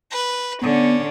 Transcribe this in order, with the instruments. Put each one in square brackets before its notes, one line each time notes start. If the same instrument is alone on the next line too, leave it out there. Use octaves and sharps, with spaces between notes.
[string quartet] B4
[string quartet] D3 C#4 [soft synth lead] B3